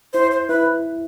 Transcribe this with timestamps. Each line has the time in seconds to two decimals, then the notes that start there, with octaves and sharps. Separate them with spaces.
0.13 E4 C5
0.31 C5
0.48 E4 B4